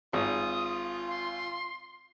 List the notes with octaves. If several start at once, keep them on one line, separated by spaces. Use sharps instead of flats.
G#1 F4 D#6
C6